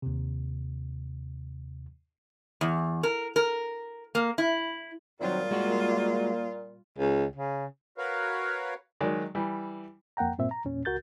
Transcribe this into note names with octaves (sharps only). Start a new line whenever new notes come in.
D#2 C3
E2
A#4
A#4
A#3
E4
A#2 D#3 F#3 G3 C4 F4
G#3 A#3 F#4
C#2
C#3
F#4 A#4 B4 C#5 F5
D#3 F#3 G#3 D5
E3 G3
F2 A#3 F#5 G5 A#5
G2 A#2 C4 E5
A#5
E2 A#2 C#4
C#2 F#4 A#4 G6 A6